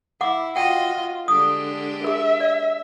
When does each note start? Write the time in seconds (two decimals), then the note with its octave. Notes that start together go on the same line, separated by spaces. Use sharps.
0.21 E4 F#5 D6
0.56 F4 F#4 D#5 F#5 G5
1.28 D3 G#3 D4 G4 D#6
2.04 G#4 A#4 E5
2.40 D5